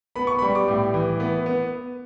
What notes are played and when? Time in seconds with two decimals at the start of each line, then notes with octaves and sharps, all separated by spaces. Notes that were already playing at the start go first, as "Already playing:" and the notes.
0.16 B3 B5
0.27 C#6
0.39 G3 B5
0.55 D6
0.68 A2
0.94 E3
1.20 B3
1.46 B3